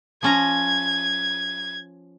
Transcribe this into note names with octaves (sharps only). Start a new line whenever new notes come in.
F3 C#4 A#5 G#6